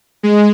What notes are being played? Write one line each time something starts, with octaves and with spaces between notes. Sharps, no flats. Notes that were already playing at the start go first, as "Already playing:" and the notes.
G#3